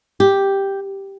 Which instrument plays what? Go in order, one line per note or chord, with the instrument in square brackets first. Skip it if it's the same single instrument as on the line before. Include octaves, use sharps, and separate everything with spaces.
[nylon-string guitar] G4